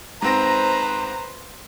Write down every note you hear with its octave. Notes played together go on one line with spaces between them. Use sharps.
G#2 C4 B4 C5 A#5 A#6